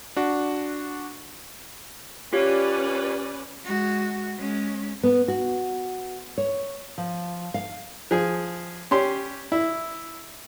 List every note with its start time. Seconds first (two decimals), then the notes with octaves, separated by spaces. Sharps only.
0.16 D4 F#4
2.33 C#4 F4 G4 B4 C#5 D5
3.65 G#3 F#4
4.37 G#3 C#4
5.03 B3
5.28 F#4
6.38 C#5
6.98 F3
7.54 F5
8.11 F3 G#4
8.91 C#4 G4 C6
9.52 E4